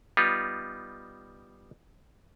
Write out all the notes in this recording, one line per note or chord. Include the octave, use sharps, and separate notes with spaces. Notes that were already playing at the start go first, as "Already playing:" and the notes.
G3 B3 D#4 F4